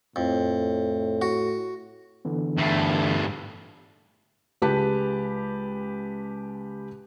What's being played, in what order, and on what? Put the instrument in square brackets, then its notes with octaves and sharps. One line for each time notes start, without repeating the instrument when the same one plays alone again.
[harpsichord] F2 [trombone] A2
[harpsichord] F#4
[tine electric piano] D3 E3 B3
[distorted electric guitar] G2 A3
[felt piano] C#2 G#3 G4 B4 A5